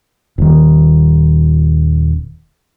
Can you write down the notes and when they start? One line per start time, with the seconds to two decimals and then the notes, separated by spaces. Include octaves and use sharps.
0.38 D#1 D#3